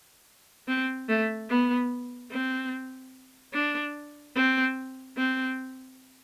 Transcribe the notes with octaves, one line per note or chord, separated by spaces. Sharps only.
C4
A3
B3
C4
D4
C4
C4